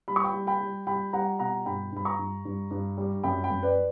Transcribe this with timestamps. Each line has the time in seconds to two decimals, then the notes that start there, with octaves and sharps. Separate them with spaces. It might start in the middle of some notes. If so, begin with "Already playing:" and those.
0.08 G3 B5
0.16 C#6
0.24 G5 B5
0.34 G3
0.47 G5 B5
0.61 G3
0.87 G3 G5 B5
1.13 G3 F#5 A#5
1.39 B2 F#5 A#5
1.66 G2 G5 B5
1.92 G2 B5
2.05 A#5 C#6
2.19 G2
2.45 G2
2.71 G2
2.98 G3
3.23 F#2 G5 B5
3.44 G5 B5
3.50 F#2
3.63 B4 D5